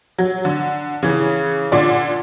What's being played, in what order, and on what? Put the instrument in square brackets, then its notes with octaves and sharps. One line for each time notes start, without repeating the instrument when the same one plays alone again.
[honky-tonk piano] F#3
D3
C#3 E3
A#2 D3 D5